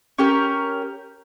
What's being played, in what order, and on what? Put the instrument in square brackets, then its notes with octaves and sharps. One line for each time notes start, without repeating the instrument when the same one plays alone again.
[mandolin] C#4 G4 A#4